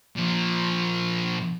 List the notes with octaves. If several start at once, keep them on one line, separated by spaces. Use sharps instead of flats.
A#2 F3